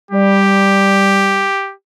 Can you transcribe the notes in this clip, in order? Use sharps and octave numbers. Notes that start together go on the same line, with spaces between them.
G3 G4